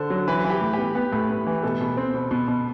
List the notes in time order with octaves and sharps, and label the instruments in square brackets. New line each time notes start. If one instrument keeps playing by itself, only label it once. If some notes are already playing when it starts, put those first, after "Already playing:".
Already playing: [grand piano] D3 [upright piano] C5
[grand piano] F#3
[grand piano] E3 [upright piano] B4
[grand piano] E3
[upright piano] G4
[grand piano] A2
[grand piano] B3 [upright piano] G4
[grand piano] B3 [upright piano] G4
[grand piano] A2
B3
E3
[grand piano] B2 [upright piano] A4
[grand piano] B2
C4
B2
B2
B2